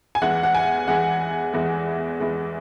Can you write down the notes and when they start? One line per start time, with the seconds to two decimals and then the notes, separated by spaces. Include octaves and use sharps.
0.15 G#5
0.22 E2 E3 G#3 F#5
0.43 F#5
0.55 G#5
0.88 E2 E3 G#3 F#5
1.53 E2 E3 G#3
2.20 E2 E3 G#3